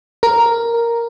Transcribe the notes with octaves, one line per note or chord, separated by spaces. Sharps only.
A#4